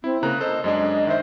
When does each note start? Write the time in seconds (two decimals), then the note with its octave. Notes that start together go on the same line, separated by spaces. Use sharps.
0.04 C4 E4
0.23 C#3 A#3 A#5 F#6
0.41 A4 C5 D#5
0.64 F#2 G#3 D4 D#5
1.07 D#3 C5 E5